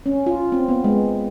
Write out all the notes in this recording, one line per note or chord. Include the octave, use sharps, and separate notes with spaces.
C#4
F4
C4
B3
G#3